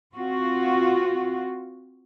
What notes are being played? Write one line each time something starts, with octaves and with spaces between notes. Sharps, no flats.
C4 F4 F#4